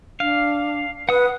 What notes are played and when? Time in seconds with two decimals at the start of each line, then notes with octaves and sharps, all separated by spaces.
0.20 D4 F5
1.09 B4 F#5 D#6